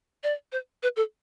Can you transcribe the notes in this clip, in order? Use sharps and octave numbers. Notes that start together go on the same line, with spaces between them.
D5
C5
B4
A4